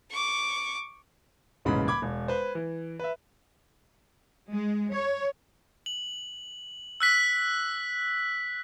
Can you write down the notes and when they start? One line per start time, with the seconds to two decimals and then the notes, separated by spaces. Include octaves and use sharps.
0.11 C#6 D6
1.65 D#1 B1 G#2 C#3 E3 B5
1.88 B5 D6 G#6
2.02 E1
2.28 B4 C5
2.55 E3
2.99 B4 E5
4.51 G#3
4.91 C#5
5.86 F#7
7.00 E6 F#6 B6